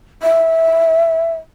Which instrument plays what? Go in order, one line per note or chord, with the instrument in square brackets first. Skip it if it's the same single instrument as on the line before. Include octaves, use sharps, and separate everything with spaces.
[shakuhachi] E5